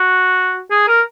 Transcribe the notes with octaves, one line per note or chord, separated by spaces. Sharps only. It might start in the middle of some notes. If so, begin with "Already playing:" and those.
Already playing: F#4
G#4
A#4